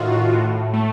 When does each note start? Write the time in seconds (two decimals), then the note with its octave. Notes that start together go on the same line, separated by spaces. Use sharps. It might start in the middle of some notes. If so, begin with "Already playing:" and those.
Already playing: A2 D#3 F4 F#4
0.33 A2
0.73 A3